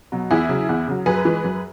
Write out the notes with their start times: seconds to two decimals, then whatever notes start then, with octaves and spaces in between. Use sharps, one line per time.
0.12 B2 F#3
0.30 E2 E4 G#4
0.49 C#3 F#3
0.69 E2
0.87 C#3 F#3
1.06 F#2 G#4 B4
1.25 E3 G#3
1.44 F#2